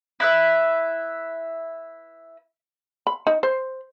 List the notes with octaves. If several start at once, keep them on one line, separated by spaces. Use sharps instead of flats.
E4 B4 E5
B5
D#4
C5